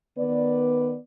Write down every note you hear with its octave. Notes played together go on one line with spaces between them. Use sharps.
D#3 B3 B4 D5